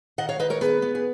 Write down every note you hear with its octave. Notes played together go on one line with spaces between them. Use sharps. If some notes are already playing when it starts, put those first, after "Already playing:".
D#3 D#5 F#5
C#5 F5
D#3 B4 D#5
A#4 C#5
B3 G#4 B4
B3
G#4